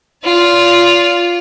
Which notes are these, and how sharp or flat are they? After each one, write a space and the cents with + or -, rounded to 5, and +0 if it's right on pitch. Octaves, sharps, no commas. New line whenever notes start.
F4 +0 D5 -35